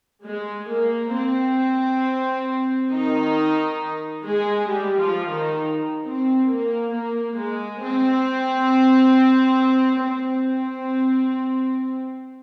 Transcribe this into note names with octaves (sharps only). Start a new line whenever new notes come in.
G#3
A#3
C4
D#3 D#4
G#3 G#4
G3 G4
F3 F4
D#3 D#4
C4
A#3
A#3
G#3
C4
C4